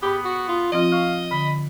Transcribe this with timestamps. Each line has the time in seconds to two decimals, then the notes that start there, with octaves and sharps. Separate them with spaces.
0.03 G#2 B3 G4 B5
0.25 F#4
0.49 F4
0.72 F3 C4 F4 D#5
0.92 F5 C#6
1.31 D3 B5